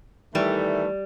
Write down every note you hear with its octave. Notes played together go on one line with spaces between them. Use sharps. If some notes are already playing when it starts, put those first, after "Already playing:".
D#3 E3 G3 A3